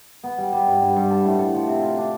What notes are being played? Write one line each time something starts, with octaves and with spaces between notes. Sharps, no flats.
B3
G3
G3
G2
G2
G2
A4
A2
A4
F3
C3
F4
D4